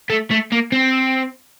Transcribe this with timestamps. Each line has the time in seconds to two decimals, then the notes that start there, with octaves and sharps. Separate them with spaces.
0.10 A3
0.31 A3
0.52 A#3
0.72 C4